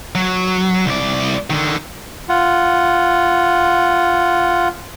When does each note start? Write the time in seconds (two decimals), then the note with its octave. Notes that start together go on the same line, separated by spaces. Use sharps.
0.15 F#3
0.86 C2 D5
1.50 D3 D#3
2.29 F4 F#5